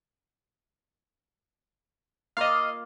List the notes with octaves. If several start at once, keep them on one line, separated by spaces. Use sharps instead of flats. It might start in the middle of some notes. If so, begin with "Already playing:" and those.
A#3 F4 D#5 F5